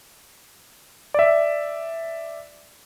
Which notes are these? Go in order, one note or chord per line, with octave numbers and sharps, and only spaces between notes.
D5 E5